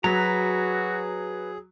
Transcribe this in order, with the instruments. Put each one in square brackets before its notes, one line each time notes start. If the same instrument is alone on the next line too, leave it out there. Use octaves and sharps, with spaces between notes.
[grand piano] F#3 [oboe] F#4 [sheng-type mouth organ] G#4 [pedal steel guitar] B4 A#5